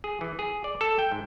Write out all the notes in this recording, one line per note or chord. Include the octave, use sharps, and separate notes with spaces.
G#4
E3
G#4
D5
A4
G5
G#2